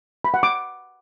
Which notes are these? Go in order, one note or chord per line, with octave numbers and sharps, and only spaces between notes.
B5
F#5
D6